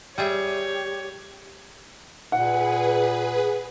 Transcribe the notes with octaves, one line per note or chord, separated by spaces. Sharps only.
G3 G4 G#4 C#5 E5
A#2 G#4 B4 F#5